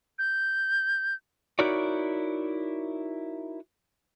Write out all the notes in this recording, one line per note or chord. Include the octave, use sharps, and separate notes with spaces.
G6
D#4 E4 F#4 A#4 C#5 D5